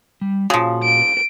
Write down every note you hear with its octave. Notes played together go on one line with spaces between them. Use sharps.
G3
A#2 C#3 F3 F#4
D7